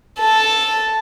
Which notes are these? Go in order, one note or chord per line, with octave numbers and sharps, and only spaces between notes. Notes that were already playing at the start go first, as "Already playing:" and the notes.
A4